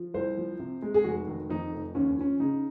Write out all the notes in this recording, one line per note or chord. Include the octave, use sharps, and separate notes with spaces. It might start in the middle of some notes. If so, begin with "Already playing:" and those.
Already playing: F3
C2 C5
F3
C3
G#3
G#4
F1 F#4
D#3
F2 D#4
F1
D#2 C#4
F3 C#4
C#3 D#4